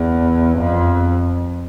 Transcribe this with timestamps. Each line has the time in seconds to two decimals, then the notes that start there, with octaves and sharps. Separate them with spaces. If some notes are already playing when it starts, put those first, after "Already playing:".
Already playing: E2
0.58 F2